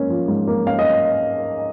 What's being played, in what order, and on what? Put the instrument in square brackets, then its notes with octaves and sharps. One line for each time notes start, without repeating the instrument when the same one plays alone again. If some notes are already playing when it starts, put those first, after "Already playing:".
Already playing: [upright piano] G#2 A#3 C#4
F3
G#2
A#3
C#4 F5
D#5